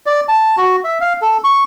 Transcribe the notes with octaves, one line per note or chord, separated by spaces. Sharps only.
D5
A5
F#4
E5
F5
A4
C#6